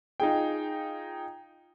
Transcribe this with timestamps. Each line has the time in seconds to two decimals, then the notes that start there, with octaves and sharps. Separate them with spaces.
0.20 D#4 F4 G#4 G5